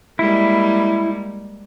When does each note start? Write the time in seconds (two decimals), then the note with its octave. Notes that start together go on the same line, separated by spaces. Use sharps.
0.19 G3 G#3 A#3 E4